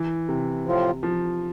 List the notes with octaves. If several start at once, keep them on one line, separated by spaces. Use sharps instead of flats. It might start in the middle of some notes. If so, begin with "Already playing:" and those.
Already playing: E3
C3
A2 F3 C4 F4
F3